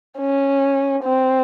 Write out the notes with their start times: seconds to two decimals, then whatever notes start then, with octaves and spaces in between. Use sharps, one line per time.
0.19 C#4
1.04 C4